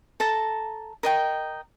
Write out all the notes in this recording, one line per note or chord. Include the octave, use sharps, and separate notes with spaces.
A4 A5 A#5
A#4 D#5 G5